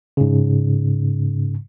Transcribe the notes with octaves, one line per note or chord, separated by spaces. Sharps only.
G#2 C#3